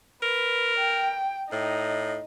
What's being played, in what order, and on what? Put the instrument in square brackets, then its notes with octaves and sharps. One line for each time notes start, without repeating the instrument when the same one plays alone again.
[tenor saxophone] A#4 [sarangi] B4
[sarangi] G5
[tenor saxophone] A2 [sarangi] D#4